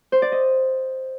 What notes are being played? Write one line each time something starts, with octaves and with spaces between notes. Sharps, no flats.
C5
D5
D#5